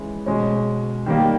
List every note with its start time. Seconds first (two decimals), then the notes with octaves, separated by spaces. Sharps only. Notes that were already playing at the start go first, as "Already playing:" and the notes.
Already playing: E3 G#3 C#4
0.26 B2 G#3 C#4
1.06 D#3 G3 A#3